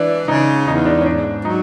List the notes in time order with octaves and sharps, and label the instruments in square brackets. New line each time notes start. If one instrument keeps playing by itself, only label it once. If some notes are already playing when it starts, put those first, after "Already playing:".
Already playing: [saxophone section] E3 [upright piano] D4
[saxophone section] C#3 [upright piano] D#4
[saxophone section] E2 [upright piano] D#4
[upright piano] D4
C#4
[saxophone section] G#2 [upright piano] D4
[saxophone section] F#3 [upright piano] D#4